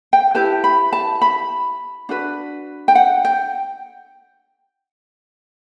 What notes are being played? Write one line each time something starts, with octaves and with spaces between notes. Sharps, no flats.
G5
E4 G4 B4 A5
B5
A5
B5
D4 F#4 B4
G5
F#5
G5